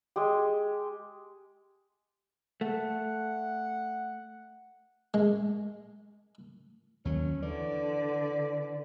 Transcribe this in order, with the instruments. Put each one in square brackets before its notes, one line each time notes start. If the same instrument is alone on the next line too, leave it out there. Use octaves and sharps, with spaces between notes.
[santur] G#3 G4
[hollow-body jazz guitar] A3 [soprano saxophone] F#5
[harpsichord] G#3
[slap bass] D#2 F#3 [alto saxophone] C#4
[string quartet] D3 [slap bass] E3 [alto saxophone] D5